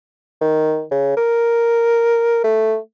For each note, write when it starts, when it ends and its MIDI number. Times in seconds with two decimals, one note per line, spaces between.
0.41 0.84 51
0.91 1.14 49
1.17 2.42 70
2.44 2.77 57